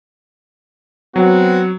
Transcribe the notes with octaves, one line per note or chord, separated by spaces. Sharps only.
F#3 B3 C4 F#4